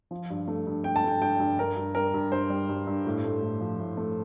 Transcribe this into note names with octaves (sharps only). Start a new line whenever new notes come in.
F3
G2
A3
G2
A3 G5
A5
A3 G5
G2 G5
G2
G2 A#4
G2
G3 A#4
G2
G2 C5
G3
G2
G2
A2
A3
A2
F3
A2
A3